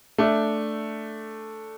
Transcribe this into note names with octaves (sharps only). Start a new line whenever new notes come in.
A3 D4